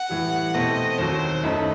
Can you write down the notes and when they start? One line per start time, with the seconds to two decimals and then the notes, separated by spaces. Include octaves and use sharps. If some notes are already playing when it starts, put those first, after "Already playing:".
Already playing: F#5
0.09 A2 E3 G3
0.54 B2 A3 C4 D#5
0.98 D#2 D#3 F#3 C5
1.43 F#2 D#3 A3 D#4 B4